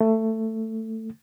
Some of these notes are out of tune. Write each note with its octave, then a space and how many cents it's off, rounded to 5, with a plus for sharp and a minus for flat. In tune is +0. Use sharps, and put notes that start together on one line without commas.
A3 +15